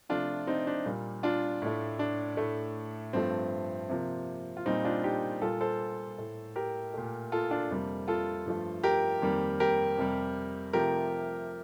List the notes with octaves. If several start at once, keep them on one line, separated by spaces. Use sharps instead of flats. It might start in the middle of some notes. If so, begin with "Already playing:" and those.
C3 F3 A3 D4 F4
C4 D#4
D4
A#2 G3 A#3
D4 F4
A2 A3
D4
A2 A3
G2 F3 A3 C4
C3 F3 A#3
F4
A#2 G3 A#3 C4 D#4
D4 F4
D#4 G4
A#2 G3 A#3 F4 A4
A4 C5
A2 A3
G4 A#4
A#2 A3
F4 A4
D4 F4
F2 C3 G3 A#3
F4 A4
G2 F3 A3
G4 A#4
F2 D#3 G3 A#3
G4 A#4
F2 C3 G3
C3 F3 A3 G4 A#4